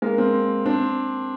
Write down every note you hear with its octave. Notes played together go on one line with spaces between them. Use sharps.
G#3 A#3
A#3 C4
C4 D4